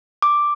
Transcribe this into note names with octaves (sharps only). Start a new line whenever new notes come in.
D6